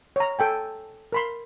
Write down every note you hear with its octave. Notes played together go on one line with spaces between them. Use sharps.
C#5 A#5
A4 G5 G#5
A#4 B5 C6